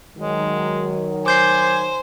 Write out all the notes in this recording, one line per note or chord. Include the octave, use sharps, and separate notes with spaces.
D#3 F#3 G#3
C5 G#5 D6 G6 C7